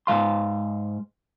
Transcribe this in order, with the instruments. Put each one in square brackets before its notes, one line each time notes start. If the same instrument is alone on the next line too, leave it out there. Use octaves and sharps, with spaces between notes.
[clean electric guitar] G#2 E3 F5 C6